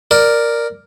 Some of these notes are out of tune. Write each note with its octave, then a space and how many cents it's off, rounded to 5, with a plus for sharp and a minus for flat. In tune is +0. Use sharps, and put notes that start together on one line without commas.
A#4 +0 D5 +5